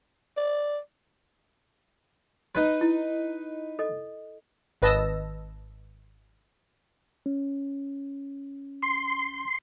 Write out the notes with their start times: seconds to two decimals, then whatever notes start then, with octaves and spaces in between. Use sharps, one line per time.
0.37 D5
2.55 D#4 B4
2.81 E4
3.79 A4 D#5
4.82 G#1 B4 D#5 A5 E6 A#6
7.26 C#4
8.82 C6